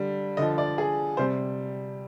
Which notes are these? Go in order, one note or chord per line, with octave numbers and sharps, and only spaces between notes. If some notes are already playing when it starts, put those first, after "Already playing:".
Already playing: D3 G3
D3 F3 D#5
D5
G#4
C3 G3 C5